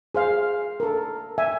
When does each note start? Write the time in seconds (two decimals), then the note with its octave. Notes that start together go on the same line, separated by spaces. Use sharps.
0.15 G#4 C5 F5
0.80 A4 A#4
1.38 E5 G#5